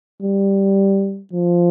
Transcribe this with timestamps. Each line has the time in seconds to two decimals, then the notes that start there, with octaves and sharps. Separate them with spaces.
0.22 G3
1.33 F3